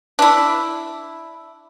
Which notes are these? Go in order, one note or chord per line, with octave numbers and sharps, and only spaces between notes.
D4 E4